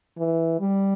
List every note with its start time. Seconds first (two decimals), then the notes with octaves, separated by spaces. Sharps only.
0.18 E3
0.60 G3